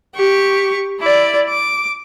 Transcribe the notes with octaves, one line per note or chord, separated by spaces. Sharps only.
G4 C#6
E4 D5
D6